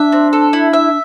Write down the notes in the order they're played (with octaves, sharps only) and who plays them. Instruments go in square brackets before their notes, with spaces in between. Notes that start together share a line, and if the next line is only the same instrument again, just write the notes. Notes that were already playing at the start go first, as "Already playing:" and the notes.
Already playing: [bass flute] D4 [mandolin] E5
[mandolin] C4
A4
E4
E5